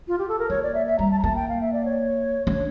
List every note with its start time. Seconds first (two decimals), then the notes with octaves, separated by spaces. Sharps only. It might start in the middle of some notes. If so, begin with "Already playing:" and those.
0.08 F4
0.19 G4
0.28 A4
0.39 A#4
0.50 A#3 C#5
0.63 D5
0.74 E5
0.86 E5
0.99 G3 A#5
1.12 A5
1.19 A#5
1.23 A#3 A5
1.36 G5
1.49 F5
1.61 E5
1.73 D5
1.85 C#5
2.46 D4 C#5